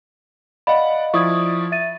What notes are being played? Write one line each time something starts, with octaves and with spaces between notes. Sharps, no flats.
D5 D#5 F5 F#5 B5
F3 E4 D5 C#6 D#6 G#6
E5 A6 D#7